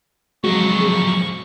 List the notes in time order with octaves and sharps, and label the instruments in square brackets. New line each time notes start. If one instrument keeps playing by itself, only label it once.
[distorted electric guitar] F2 F#3 [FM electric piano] G#3 F#4 [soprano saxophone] C#6
[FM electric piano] G#4